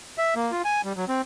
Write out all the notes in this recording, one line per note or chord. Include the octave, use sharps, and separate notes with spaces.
E5
A#3
F4
G#5
G3
F#3
C4